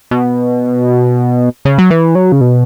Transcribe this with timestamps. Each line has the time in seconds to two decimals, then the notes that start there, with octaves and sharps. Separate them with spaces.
0.11 B2
1.65 C#3
1.78 F#3
1.90 E3
2.15 F#3
2.32 C#3
2.41 B2